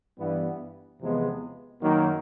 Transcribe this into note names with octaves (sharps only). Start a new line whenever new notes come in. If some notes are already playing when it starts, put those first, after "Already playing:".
G2 E3 G3 B3
E2 C3 F3 G#3 B3
F#2 D#3 F#3 A#3 D#4